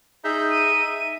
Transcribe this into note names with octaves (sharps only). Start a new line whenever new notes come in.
D#4 G#4 E5 G6
D#7
E5